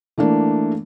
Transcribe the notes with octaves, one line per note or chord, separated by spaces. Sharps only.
E3 A3 A#3 D4